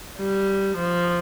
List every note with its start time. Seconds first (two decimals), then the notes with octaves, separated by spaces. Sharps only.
0.18 G3
0.77 F3